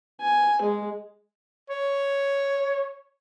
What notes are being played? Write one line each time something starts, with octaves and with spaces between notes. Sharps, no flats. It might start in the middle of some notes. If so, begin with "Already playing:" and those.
G#5
G#3
C#5